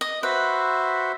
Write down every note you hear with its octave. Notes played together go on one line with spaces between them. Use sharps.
D#5
F#4 B4 C5 E5